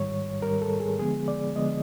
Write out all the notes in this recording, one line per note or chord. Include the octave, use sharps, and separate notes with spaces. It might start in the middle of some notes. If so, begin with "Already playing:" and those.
Already playing: G#2 D#3 G3 C#5
G#2 D#3 G3 A#4
A4
G#4
D3 F3 G#3 B3 G#4
D5
D3 F3 G#3 B3 D#5